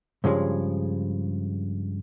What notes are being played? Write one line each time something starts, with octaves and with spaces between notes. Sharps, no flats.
G2 C#3 F3 G#3